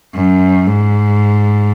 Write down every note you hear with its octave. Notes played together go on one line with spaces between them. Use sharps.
F#2
G#2